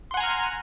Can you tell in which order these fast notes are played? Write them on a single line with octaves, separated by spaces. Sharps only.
C6 F#5 G#5 A#5 F6